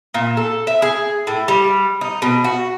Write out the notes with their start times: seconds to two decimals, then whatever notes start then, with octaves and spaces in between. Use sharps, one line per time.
0.14 A#2
0.37 A4
0.67 E5
0.82 G#4
1.27 A2
1.48 G3
2.01 D#4
2.22 B2
2.44 F#4